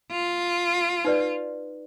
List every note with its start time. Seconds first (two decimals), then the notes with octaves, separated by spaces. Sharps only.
0.11 F4
1.05 D#4 B4 D5